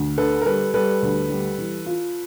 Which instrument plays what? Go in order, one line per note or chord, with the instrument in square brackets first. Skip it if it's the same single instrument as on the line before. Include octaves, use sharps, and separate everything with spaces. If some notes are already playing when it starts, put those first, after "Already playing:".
Already playing: [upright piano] D2
[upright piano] D3 [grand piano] A4 B4
[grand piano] A#4
[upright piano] G3 [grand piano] A4 B4
[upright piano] G3 [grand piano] A4 B4
[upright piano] D2
G3
E3
F4